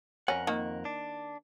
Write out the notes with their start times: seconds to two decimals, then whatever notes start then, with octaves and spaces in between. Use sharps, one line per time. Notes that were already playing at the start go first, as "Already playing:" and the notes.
0.28 F2 C#4 A#4 F#5
0.47 D#3 A#3
0.85 D4